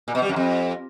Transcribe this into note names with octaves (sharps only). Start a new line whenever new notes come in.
A#2
B2
G3
F#2
F2